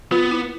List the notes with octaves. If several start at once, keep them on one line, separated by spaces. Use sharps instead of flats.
B3 F4
E4